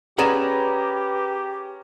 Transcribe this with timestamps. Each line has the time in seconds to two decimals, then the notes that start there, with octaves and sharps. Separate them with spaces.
0.18 C#4 G4 G#4 B4 D5 F#5 A#5 E7